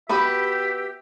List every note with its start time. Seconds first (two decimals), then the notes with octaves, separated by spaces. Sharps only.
0.09 B3 F#4 G4 B4 E5